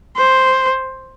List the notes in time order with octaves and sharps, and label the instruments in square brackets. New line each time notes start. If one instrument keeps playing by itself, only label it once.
[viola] C5